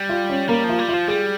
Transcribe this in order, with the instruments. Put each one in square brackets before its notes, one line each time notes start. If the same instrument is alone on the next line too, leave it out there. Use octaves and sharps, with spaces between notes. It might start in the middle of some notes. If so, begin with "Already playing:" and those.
Already playing: [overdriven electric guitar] G3
[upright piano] F4
C#4
[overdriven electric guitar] G3 [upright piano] A#3
[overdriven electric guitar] F3
[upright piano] F4
[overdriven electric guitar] G3
[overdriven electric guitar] F3 [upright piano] F4
[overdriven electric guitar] G3 [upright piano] G#4